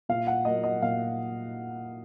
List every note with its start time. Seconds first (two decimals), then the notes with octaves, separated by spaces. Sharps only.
0.09 A#2 F5
0.27 F#5
0.45 F#3 A#3 D#5
0.64 D#5
0.82 A#2 F5